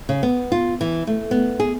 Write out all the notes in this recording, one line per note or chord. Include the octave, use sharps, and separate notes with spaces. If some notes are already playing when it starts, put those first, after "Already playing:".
C#3
B3
F4
E3
A3
B3
G#4